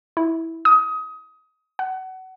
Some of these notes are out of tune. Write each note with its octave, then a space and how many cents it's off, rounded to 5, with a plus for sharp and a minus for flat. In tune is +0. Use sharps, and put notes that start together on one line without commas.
E4 -10
D#6 +25
F#5 +25